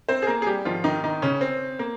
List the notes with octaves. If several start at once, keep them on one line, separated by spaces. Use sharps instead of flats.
C4 C5
G#4
A#3 A#4
G#4
G3 G4
G#2 D#3 F3 F4
D#3 D#4
D#3 D#4
C#3 C#4
C4
A#3